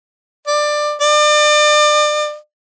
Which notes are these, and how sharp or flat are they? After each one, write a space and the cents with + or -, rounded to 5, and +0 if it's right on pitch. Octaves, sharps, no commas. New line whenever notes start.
D5 +20
D5 +35